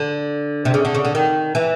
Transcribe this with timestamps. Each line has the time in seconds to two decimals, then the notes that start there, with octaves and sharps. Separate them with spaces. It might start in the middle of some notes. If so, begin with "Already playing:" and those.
Already playing: D3
0.65 C3
0.74 C#3
0.85 D3
0.95 C#3
1.05 D3
1.15 D#3
1.55 E3